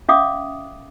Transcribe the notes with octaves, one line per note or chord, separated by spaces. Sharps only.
C#4 E5 F5 D6 D#6